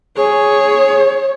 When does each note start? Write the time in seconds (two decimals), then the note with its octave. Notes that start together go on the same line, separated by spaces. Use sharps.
0.17 G#4 C#5